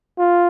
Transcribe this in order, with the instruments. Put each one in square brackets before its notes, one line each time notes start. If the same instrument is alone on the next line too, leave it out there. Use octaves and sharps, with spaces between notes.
[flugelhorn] F4